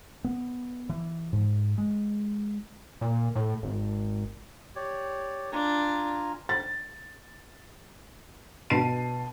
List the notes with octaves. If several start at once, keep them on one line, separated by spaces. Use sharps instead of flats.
B3
E3
G#2
G#3
A#2
A2
G#1
G4 C#5 D5
D4 F4 G#5 A#5
A6
B2 A5 C7 D#7